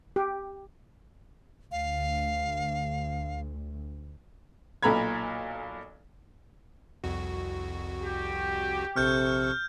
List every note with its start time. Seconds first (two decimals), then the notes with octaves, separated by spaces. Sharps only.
0.16 G4
1.71 D2 F5
4.83 B1 A#2 A4 A#5 B5 G#6
7.04 C2 F2 F#4
8.03 G4
8.96 A#1 C3 A4 C#6 F6 G6